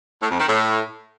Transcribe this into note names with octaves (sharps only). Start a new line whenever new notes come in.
A2
F2
D#3
A2